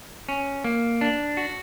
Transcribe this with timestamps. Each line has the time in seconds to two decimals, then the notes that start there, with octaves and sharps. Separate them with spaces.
0.29 C#4
0.64 A#3
1.01 D4
1.37 F#4